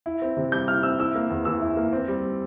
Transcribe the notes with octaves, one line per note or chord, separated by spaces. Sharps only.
E4
C4
C3
G3 G6
E4 F6
C4 E6
E4 E6
A#3
E2
E3 E6
E4
A#3
C4
G3